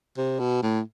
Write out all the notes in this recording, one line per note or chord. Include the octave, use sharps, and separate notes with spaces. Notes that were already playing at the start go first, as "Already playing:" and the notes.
C3
B2
A2